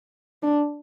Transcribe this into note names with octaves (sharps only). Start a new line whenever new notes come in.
D4